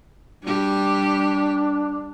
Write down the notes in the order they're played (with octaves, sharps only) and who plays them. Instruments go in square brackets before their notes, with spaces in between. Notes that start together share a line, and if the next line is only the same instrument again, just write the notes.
[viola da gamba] G3 G4 [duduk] D4